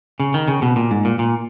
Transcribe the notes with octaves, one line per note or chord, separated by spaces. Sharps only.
C#3
D#3
C#3
B2
A#2
G#2
A#2
A#2